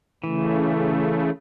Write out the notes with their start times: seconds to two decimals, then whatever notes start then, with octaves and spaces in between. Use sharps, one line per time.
0.24 C#3 E3 A3